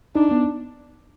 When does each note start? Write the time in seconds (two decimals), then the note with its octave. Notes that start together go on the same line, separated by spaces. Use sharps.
0.15 D4 D#4
0.31 B3